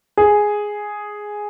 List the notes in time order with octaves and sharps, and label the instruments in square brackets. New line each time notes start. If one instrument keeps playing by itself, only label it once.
[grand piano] G#4